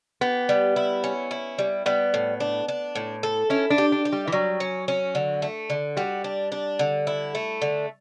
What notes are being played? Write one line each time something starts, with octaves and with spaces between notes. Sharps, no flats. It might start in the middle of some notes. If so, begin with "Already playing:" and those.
B3 G4
G3
E4
C#4
E4
G3
G3 B3
A2
D4
D4
A2
A4
C#4 E4
D4
G4
D4
G4
G3
E3
F#3 G3
C#4
C#4
D3
A3
D3
G3 F#4
D4
D4
D3
E4
A3
D3